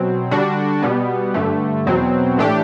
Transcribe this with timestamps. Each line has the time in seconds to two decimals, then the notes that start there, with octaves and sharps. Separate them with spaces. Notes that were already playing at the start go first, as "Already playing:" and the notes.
Already playing: B2 F#3 C4
0.31 D3 G3 D4 F#4
0.82 B2 G3 B3
1.34 G2 D3 A3
1.86 E2 B2 F#3 C4
2.37 A2 E3 A3 D4 G4